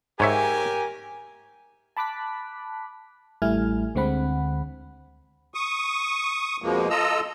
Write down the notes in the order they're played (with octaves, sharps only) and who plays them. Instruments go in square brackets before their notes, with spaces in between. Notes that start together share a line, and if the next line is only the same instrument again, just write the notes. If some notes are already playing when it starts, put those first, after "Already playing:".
[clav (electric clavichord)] G#2 C#5 E5 [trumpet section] G4 A#4 G#5
[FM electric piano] A5 B5 D6 F#6 B6
A1 G3 A3 E4 G#5 F6
D2 D3 G#3 C4 F#5 B5
[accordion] C#6 D#6
F2 B2 F3 G#3 A#3
F4 A4 D#5 A#5 E6